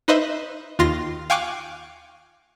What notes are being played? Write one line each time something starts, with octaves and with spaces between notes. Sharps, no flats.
D#4 B4 C5 D#5 E5
D#2 F4 C6 A#6
F5 G5 G#5 C#6 D6 F#6